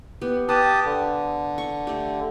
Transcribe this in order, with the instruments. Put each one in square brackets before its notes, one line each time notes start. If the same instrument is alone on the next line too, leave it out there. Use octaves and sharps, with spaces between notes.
[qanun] B3 G4
[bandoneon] G4 A5 D#6 [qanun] B4
[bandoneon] D3
[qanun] C#6
A3 G4